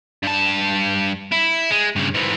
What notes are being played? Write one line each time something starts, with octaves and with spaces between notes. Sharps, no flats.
G2 A5
E4
G#3
G2 C#3
G#2 E3